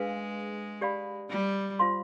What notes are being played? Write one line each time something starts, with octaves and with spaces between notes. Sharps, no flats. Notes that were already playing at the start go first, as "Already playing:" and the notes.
Already playing: G#3 D4 G#4 B4 F5
G4 D5 F5 B5
G3
F4 C5 F5 C6